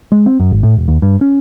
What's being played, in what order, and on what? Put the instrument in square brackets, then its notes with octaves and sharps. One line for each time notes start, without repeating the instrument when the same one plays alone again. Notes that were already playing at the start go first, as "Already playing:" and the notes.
[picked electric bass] G#3
C4
F#2
G#1
A2
E1
D#2
G2
C#4